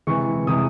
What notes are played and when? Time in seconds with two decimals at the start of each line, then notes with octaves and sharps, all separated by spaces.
0.07 C3 E3 G#3 C#6
0.47 C3 E3 G#3 D#6